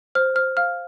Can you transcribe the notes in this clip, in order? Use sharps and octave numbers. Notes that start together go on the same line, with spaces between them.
C5 F6
C5 F6
F5 F6